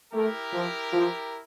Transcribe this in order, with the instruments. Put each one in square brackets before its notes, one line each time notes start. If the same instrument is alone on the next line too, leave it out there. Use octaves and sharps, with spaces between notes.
[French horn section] A3 [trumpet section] E4 G4 A#4
[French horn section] F3
F3